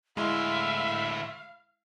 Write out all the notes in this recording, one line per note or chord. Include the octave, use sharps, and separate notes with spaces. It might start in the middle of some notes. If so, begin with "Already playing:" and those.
D2 A2 G#3 E4 E5 F5